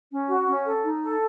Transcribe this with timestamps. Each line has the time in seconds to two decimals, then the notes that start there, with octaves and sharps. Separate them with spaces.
0.11 C#4
0.29 F#4
0.47 C#4
0.65 A4
0.84 D#4
1.02 A4